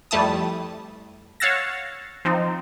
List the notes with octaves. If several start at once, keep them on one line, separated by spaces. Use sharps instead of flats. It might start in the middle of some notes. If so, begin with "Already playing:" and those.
F2 G3 A3 E4 A5 D#6
C#5 F5 F#5 E6 A6 A#6
F3 C4 D#4